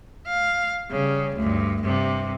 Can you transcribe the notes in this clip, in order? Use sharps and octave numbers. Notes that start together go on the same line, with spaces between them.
F5
C#3 G3
D2 G2
G2 C3